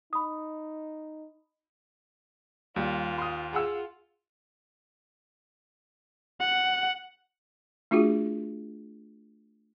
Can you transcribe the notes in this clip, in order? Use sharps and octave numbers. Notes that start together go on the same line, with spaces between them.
D#4 B5 D#6
D#2 G3 F4
C6 D#6
F4 G#4 F#5 E6
F#5
A3 D4 F4 F#4 G#4